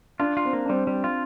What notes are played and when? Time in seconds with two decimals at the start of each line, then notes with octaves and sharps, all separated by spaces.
0.20 D4 F4
0.37 F4
0.45 C4
0.53 A#3
0.65 D4
0.69 G3 C4
0.87 G3
1.04 F4